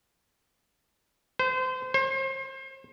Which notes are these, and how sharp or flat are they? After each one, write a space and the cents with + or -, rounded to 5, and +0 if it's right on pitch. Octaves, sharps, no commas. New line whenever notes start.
C5 -30
C5 +35